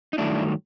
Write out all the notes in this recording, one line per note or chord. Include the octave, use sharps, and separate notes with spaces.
D#4
G2 D#3 F#3 A3 D4 E4